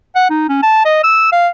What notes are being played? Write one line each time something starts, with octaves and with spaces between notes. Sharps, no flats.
F#5
D#4
C#4
A5
D#5
E6
F5